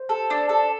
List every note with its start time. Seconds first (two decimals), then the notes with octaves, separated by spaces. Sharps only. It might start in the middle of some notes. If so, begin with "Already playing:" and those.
Already playing: C5
0.09 A4
0.30 D4
0.49 A4